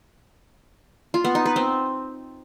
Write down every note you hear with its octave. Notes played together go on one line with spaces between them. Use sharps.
F4
B3
D#4
B4
C4